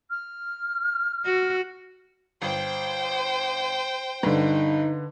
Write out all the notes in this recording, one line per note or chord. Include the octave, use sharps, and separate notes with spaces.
F6
F#4
G1 C5 G5
G2 D3 D#4 B4